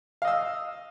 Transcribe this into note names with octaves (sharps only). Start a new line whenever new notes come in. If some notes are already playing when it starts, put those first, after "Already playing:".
D#5 F5 E6